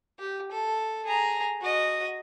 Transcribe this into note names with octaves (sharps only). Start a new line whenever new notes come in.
G4
A4
G#4 A#5
F#4 D#5